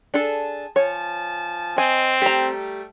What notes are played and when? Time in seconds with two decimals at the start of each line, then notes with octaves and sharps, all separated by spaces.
0.14 D4 G#4 A4 A5
0.76 F3 C#5 G#5 A5
1.78 C4 D#5 G#5
2.22 G3 A3 G4 A#5